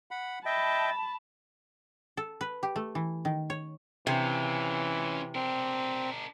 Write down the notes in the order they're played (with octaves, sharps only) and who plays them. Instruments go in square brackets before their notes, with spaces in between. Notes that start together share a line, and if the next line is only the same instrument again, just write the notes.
[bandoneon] F#5 B5
[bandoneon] D#5 E5 G5 [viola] A5 B5
[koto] A4
B4
G4
A3
E3
D#3
C#5
[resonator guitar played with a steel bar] C3 [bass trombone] E3 [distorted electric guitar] C#4 F4
[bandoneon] C4 [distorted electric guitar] D4 A#4